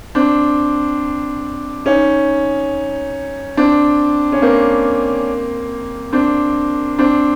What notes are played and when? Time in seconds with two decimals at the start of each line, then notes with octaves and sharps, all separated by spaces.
0.15 C4 D4
1.86 C#4 D#4
3.57 C4 D4
4.32 C#4
4.42 A#3 C4
6.13 C4 D4
6.98 C4 D4